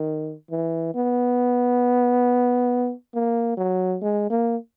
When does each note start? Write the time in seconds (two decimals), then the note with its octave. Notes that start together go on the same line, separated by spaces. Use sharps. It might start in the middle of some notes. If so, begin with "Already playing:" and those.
Already playing: D#3
0.51 E3
0.95 B3
3.14 A#3
3.57 F#3
4.02 G#3
4.30 A#3